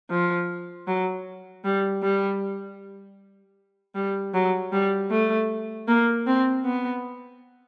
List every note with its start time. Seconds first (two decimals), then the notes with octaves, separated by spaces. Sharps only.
0.10 F3
0.87 F#3
1.65 G3
2.03 G3
3.95 G3
4.34 F#3
4.72 G3
5.11 A3
5.88 A#3
6.27 C4
6.65 B3